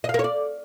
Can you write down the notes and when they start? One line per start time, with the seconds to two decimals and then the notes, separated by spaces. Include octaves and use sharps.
0.04 D#5
0.09 F5
0.14 A#4
0.19 C#5
0.24 D5